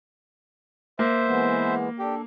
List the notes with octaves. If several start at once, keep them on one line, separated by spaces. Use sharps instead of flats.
A#3 C5 E5
E3 G#3 B3
D4 G4 A4